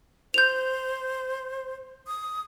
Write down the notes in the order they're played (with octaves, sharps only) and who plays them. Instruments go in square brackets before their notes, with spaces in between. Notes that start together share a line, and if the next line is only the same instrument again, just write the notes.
[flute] C5 [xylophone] G6 F7
[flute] D#6